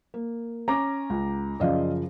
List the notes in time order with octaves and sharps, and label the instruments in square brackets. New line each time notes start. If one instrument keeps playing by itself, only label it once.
[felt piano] A#3
[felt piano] C#4 [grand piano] A#5 D6 A#6
[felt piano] C#2
[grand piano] F#2 C#3 F3 [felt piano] D5 D#5 F5